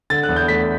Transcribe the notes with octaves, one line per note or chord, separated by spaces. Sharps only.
D3 A6
F#6
E2
G6
A3 B6